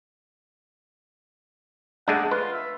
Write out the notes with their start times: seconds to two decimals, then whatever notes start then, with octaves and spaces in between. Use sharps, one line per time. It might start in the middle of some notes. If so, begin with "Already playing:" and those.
2.08 G#3 A3 D4 F#5
2.31 F4 B4
2.53 E5